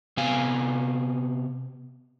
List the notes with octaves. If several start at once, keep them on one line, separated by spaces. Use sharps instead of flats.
C3 B3 F5 G#5